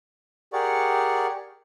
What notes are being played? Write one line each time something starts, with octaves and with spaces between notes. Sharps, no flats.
G4 G#4 A#4 D5 F#5 C#6